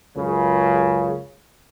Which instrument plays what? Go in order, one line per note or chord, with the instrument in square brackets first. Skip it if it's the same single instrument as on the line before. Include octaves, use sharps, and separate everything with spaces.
[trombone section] C#2 F#2 C#3